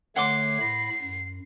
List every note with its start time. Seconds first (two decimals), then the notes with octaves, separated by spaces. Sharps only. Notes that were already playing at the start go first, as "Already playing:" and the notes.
0.16 D3 A3 C#5 F#5 C6 D6 C7
0.61 A2 B5 A#6
1.02 F#2